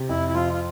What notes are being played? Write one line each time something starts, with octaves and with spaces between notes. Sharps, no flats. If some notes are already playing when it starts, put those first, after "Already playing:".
Already playing: C3
F2 E4
E4
F3 F4
F4